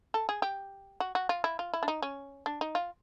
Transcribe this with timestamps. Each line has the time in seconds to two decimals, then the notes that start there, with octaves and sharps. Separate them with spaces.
0.14 A4
0.29 G#4
0.42 G4
1.00 F#4
1.15 F#4
1.29 F4
1.44 E4
1.59 F4
1.74 E4
1.83 D4
1.88 D#4
2.02 C#4
2.46 D4
2.61 D#4
2.75 F4